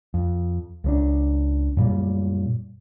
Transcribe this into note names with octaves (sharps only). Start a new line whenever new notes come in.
F2
C#2 F3 D4
F#2 A#2 G3